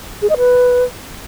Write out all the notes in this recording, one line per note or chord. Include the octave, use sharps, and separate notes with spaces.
G#4
D#5
B4